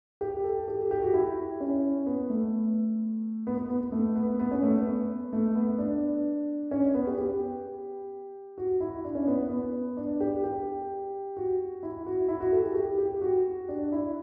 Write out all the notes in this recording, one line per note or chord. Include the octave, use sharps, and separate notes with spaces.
G4
A4
G4
A4
G4
F#4
E4
C#4
B3
A3
B3
B3
B3
B3
A3
B3
B3
C#4
A3
B3
A3
B3
D4
C#4
B3
G4
G4
F#4
E4
D4
C#4
B3
B3
D4
G4
G4
F#4
E4
F#4
E4
F#4
A4
G4
G4
G4
F#4
D4
E4